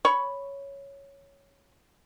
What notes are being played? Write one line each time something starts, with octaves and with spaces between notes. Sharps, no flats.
C#5 B5 C#6